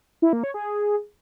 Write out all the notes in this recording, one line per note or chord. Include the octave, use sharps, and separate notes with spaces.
E4
A#3
C#5
G#4